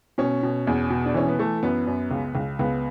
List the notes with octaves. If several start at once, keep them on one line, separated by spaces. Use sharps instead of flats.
B2 C#4
B2
E2
B2
D4
E3 C#4
B3
E3 A3
F#2 B3
F#2
C#2
C#2
C#2 B3